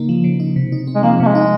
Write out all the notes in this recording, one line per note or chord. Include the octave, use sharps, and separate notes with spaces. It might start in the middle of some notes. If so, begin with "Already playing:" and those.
Already playing: C#3 A#3 D#4
F3
C#3
D#4
C3
D#4
C4
G#3
F3 A#3
C3 A#3
G#3
D#4